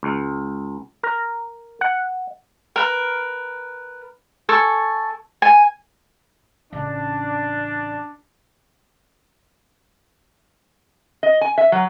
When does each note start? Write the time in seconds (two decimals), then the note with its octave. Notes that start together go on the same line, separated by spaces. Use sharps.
0.03 C#2
1.03 A#4
1.81 F#5
2.76 A#4 B4
4.49 A4 G#5 C#6
5.42 G#5
6.73 A1 C#3 D4
11.23 D#5
11.41 G#5
11.58 E5
11.72 F#3